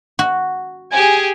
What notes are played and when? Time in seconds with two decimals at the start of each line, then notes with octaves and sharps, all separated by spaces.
0.19 F#4
0.92 G4 G#4 G#5